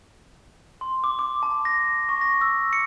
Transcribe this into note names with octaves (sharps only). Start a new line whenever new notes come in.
C6
D6
D6
A5
A#6
C#6
A#6
E6
C#7